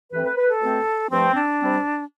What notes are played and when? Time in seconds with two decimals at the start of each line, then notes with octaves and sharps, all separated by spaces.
0.11 G2 E3 A3 C4 B4
0.24 B4
0.36 B4
0.49 A4
0.60 B2 A3 C4
1.09 G2 F3 A3 C4
1.34 D4
1.59 C3 G3 C4